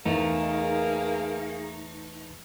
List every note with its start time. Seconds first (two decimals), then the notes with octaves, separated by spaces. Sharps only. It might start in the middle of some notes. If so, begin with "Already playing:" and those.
0.05 E2 A3 A#3 D#4 G#4 A#4